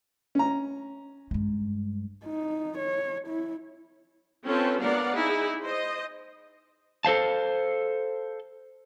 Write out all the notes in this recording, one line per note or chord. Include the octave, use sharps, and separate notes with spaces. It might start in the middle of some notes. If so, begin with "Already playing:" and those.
C#4 A#5
G2 G#3
D#4
C#5
E4
C4 C#4 F4 A4 B4 C5
B3 D4 A#4 D5 F5 F#5
D#4 E4 G#4
C5 D#5
A4 C5 F5 A5